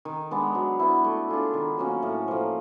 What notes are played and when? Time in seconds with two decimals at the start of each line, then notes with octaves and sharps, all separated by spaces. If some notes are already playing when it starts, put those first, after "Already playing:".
0.05 D#3
0.31 G#3 B3 D4
0.55 F#3
0.79 B3 E4
1.04 A3
1.29 D4 F4 G#4
1.53 D#3
1.78 F#3 A#3 C#4
2.02 A2
2.28 F3 A#3